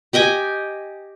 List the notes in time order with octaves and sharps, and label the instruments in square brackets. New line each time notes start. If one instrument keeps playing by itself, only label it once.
[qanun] G4 D#5 G5 G#5